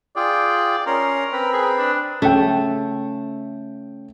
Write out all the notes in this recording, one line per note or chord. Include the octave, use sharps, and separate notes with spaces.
F4 G#4 D5 G5
C#4 A#4 C6
C4 B4
G#4
D4
C#3 A3 G5